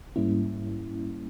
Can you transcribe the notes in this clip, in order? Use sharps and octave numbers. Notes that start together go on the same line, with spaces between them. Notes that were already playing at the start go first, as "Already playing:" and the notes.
G#2 G3 A#3 C#4 E4